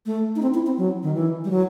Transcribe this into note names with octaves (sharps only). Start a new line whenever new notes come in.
A3
D#4
C4
E4
C4
F#3
D#3
E3
G3
F#3